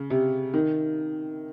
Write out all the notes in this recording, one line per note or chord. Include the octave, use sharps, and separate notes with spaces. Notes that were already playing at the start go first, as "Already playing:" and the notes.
Already playing: C#3
C3
D#3